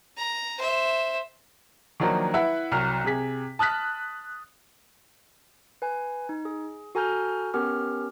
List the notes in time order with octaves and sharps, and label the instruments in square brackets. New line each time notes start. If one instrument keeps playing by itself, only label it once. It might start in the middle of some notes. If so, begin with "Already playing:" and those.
[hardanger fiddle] A#5
C5 E5
[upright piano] D#3 F3 F#3 A#3 D4
E4 B4 E5 F#5
C2 F#3 F6
C3 G#4 B6
A5 D#6 F6 F#6 B6
[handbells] B4 G#5
D#4
G#4
F#4 A4 G#5 A#5 F6 G6
B3 C#4 G4 A#4 F6